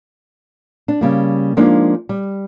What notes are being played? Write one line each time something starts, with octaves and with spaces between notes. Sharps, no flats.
D4
C#3 G3 A#3
F3 G#3 A#3 D4 D#4
G3